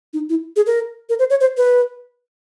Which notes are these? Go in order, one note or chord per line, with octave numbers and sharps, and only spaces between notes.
D#4
E4
G#4
A#4
A#4
C5
C#5
C5
B4